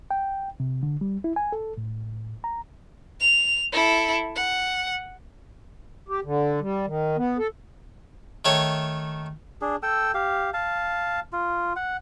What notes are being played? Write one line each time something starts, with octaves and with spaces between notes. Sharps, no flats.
G5
C3
D3
G3
E4
G#5
A4
A2
A#5
F7
E4 A4
F#5
G4
D3
G3
D#3
B3
A4
D#3 A3 C#5
D4 G#4
A4 G5 E6
G4 F5
F5 A5
F4
F#5